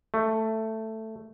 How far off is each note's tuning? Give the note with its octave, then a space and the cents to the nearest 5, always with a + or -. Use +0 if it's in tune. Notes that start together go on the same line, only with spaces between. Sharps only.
A3 +5